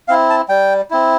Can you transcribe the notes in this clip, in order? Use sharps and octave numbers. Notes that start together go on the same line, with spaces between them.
C4 E4 F5
A5
G3 G5
C4 E4